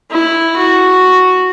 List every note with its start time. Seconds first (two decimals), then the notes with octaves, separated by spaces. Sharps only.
0.11 E4
0.56 F#4